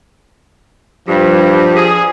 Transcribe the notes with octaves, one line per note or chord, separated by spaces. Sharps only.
G2 F3
G#4